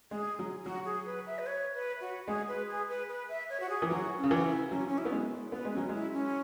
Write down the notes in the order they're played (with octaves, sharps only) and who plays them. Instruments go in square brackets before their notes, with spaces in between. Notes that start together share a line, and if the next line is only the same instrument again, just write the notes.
[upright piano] G#3 [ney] G#4
[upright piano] F#3
[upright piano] F#3 [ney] F#4
[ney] G#4
B4
E5
B4
C#5
B4
F#4
[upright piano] G#3 [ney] G#4
[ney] B4
G#4
B4
B4
E5
C#5
F#4
G#4
[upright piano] E3
[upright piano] F#3 [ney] F#4
[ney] C#4
[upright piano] C#3
E3
[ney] F#4
E4
[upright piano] F#3 [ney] C#4
[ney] C#4
E4
[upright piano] B3
G#3
[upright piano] B3 [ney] B4
[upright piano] G#3
[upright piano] F#3 [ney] C#4
[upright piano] G#3 [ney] E4
[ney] C#4